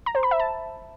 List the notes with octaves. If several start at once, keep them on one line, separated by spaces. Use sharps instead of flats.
A#5
C5
B5
E5
A5